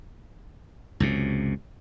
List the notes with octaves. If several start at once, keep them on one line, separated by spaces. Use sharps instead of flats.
C#2 F#2 C3